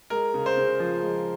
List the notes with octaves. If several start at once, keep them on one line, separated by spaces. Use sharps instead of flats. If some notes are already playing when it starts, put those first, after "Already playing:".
G#3 A#4
C#3
C5
C#3
F3
G#3